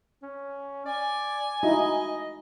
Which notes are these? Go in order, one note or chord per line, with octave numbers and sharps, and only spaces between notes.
C#4
D5 G#5
D#4 E4 F#4 D#5